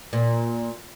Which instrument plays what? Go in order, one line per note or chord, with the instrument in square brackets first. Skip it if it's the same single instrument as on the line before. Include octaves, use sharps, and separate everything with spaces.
[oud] A#2